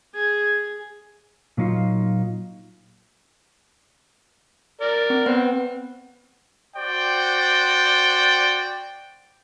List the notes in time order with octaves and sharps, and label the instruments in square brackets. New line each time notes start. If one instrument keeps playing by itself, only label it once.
[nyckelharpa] G#4 [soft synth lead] G#6
[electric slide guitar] A#2 F#3 D#4 F4
[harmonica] A#4 D5
[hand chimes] C4
[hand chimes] B3 B4 F#5 [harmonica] C4
[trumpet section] F#4 C5 D5 G5